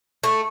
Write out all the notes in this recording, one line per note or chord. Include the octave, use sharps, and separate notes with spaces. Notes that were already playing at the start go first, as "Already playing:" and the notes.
A3